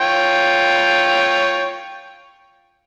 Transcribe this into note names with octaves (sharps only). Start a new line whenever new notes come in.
F4 C#5 G5